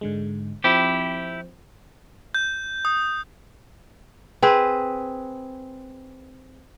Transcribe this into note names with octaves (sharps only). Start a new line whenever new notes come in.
G#2 D3 G#3
F3 C4 E4 G4
G6
D#6
C4 G#4 B4